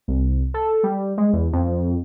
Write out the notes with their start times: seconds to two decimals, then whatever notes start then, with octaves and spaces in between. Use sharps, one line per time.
0.08 C2
0.54 A4
0.83 G3
1.18 G#3
1.33 E2
1.53 F2